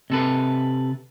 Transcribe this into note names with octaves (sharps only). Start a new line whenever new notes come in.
C3 A4 B4